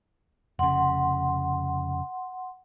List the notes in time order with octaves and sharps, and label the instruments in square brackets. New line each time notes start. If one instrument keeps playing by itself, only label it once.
[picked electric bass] F1 C#3 [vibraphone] F#5 C6